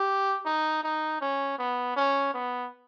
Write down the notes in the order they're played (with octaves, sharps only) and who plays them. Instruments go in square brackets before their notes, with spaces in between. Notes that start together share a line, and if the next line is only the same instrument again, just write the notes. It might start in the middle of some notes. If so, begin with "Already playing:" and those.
Already playing: [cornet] G4
D#4
D#4
C#4
B3
C#4
B3